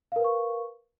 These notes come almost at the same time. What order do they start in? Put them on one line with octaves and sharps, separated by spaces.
F5 A#4 B4 C#6